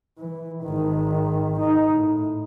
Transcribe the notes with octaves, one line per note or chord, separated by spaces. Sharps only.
E3
G#1 D#3
D#4
A2